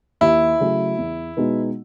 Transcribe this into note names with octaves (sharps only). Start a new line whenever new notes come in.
D#2 E4
C#3 F#3 A3 C#4
E2
B2 G#3 B3 D#4